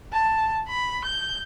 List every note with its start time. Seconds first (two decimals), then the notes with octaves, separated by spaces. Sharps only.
0.13 A5
0.68 B5
1.05 G6